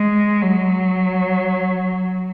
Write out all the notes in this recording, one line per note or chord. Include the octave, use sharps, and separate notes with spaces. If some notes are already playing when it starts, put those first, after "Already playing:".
Already playing: G#3
F#3